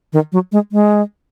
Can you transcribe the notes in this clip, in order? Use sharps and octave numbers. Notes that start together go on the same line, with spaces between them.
D#3
F#3
G#3
G#3